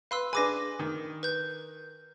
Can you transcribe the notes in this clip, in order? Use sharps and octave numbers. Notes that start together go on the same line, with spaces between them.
B4 F5 C6 E6
D4 G#4 B4 G#5 D6 A#6
D#3
B4 G6